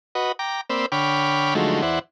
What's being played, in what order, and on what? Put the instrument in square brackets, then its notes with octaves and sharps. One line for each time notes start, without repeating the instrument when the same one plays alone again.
[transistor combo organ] F#4 B4 D#5
G5 A#5 D6
A#3 C4 C5 D5 B5 E6
D3 C#5 G5 B5 D6 F6
D3 F3 F#3 G#3 A3 D#4
E2 E4 C5 D5 F#5